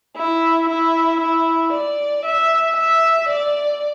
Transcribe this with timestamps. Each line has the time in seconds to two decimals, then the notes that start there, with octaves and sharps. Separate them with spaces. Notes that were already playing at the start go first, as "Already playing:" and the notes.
0.16 E4
0.69 E4
1.20 E4
1.72 D5
2.25 E5
2.76 E5
3.29 D5